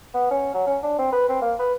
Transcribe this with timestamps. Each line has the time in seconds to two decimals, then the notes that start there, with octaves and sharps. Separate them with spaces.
0.14 B3
0.31 C#4
0.54 F#3
0.67 C#4
0.83 D4
0.99 C4
1.13 B4
1.29 C4
1.42 A#3
1.59 B4